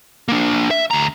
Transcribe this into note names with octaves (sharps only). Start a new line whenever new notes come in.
A#3 D4
E5
D2 A#5